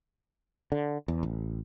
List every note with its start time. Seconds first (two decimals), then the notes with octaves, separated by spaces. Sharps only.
0.72 D3
1.08 E2
1.23 A1